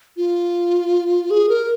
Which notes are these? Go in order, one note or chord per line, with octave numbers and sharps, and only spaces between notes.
F4
G#4
A#4